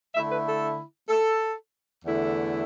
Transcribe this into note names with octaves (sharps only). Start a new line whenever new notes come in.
D3 A3 E4 E5
B4
A4
A4
E2 D3 A3 E4